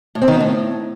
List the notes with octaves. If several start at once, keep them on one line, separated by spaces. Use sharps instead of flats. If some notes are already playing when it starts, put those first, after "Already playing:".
A2
C4
D#3
B3
A2